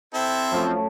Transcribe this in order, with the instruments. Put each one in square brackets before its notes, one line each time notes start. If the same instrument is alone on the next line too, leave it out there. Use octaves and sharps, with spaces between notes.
[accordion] C4 [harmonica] E4 A4
[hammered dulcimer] F#2 A3 [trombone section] F3